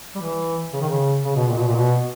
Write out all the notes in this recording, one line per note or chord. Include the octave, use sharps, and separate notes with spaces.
G3
E3
C#3
D#3
C#3
C#3
B2
A#2
B2
A#2
B2